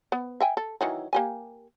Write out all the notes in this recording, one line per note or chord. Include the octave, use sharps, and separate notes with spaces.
B3
E5 G5 G#5
A4
D#3 E3 F#3
A#3 G4 G#5